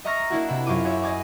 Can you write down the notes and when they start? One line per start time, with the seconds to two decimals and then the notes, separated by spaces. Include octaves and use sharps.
0.05 D#5 E5 A#5 C#6 F6 A#6
0.30 A#3 D4 E4 F#4
0.48 C3 E5 B5
0.66 F#2 C#4 F4 D6 D#7
0.84 F#4 G#4 C#5 E5
1.03 D#5 G#5 D6